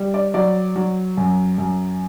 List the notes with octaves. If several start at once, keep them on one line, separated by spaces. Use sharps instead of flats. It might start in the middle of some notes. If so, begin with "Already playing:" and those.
Already playing: G3
D5
F#3 D5
F#3
F#2
F#2